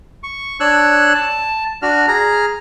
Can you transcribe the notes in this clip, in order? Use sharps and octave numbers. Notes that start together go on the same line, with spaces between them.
C#6
D4 C#5 E6 F#6
A5
D4 F#4 F6
G#4 A#5 F6